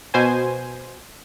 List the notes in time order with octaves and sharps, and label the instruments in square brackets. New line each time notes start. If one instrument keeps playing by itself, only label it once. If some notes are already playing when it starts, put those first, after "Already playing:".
[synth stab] B2 C5 G#5